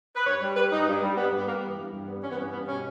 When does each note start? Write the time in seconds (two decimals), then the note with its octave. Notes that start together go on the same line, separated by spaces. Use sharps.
0.15 B4
0.26 G2 C#5
0.41 G3
0.57 G3 B4
0.71 G2 D#4
0.87 G2
1.02 G3
1.17 G3 B3
1.32 G2
1.38 B3
1.47 G3 A#3
1.63 E3 B3
1.78 G2
1.93 G2
2.08 G3 B3
2.23 E3 C#4
2.31 B3
2.38 G2 C#4
2.53 G2 B3
2.68 B2 C#4